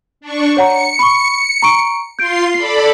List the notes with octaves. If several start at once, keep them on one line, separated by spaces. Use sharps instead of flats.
D4 C#6
C#5 F#5 A#5 C#7
B5 C#6
A#5 C#6 D7
F4 C6 G6 C7 D7
A4 D5 B5 C7